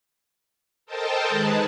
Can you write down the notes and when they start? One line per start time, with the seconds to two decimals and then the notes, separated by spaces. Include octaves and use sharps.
0.86 A4 A#4 C5 D#5 G5 A5
1.29 D#3 G#3 G#4 B4 A5